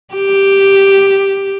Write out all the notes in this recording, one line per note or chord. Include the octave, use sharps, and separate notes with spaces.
G4